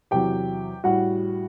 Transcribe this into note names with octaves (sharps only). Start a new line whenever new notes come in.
E2 C3 F#3 G4 G5
A2 G3 F#4 F#5